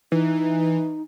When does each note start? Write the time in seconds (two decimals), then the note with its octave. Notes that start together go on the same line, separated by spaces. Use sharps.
0.12 E3 D#4